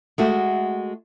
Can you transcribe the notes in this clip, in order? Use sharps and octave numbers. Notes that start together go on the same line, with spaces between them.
G#3 A3 F#4